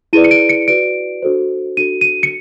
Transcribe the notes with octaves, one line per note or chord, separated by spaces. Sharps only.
E4 G#4 B4 D5 D#7
C#7
D7
C#7
F#4 B4 D5 D7
D4 F#4 A4 C5
D4 F#4 A4 D#7
D#7
C#7